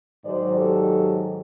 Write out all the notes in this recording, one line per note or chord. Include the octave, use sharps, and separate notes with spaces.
G#2 D#3 F#3 C5 D5
G4 A4